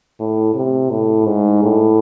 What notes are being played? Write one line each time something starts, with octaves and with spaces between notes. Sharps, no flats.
A2
C3
A2
G#2
A2